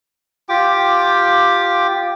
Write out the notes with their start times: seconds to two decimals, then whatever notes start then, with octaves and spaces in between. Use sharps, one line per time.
0.49 F4 G4 G5 D6